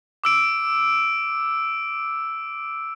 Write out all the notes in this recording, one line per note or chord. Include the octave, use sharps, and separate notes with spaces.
D6 E6 D7